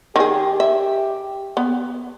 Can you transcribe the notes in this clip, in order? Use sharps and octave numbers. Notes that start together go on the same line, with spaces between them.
D#3 G4 G#4
E5
B3